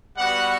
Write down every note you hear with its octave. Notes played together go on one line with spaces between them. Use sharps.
G3 B3 F#4 F#5